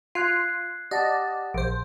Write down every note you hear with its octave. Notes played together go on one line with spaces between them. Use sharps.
F4 F#6 G#6 C7
G4 D5 D#5 F#5 A5
A#1 C5 D7